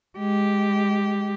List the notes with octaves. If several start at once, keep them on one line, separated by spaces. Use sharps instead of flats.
G#3 G4